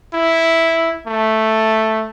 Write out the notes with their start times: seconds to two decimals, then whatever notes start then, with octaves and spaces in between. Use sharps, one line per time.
0.14 E4
1.07 A3